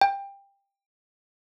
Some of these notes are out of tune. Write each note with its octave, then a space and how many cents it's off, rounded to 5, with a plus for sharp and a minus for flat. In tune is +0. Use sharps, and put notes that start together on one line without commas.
G5 +20